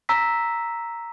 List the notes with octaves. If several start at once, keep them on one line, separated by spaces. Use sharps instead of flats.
A#5 E6 B6